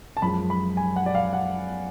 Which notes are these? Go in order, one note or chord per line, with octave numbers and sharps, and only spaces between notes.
A5
F#2 F3 G#3 B5
B5
G#5
F#5
D5
F5
F#5